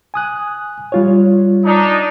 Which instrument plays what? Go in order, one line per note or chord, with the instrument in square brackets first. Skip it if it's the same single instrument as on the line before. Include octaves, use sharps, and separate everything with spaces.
[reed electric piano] G#5 D#6 F#6
G3 F4 C#5
[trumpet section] D4 D#4